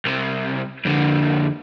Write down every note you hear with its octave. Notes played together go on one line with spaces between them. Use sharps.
C2 C3
F2 D3